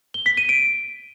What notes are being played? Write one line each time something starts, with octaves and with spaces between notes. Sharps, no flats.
G7
B6
D#7
D7